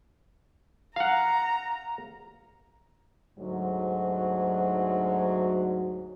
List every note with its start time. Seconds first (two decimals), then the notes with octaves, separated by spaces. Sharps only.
0.96 F5 F#5 A#5
3.38 D2 G#2 F#3